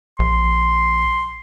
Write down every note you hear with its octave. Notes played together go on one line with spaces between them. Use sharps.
A#1 C6